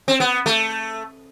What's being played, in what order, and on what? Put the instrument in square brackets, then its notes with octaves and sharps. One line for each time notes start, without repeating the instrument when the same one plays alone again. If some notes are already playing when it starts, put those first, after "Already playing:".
[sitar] C4
B3
A3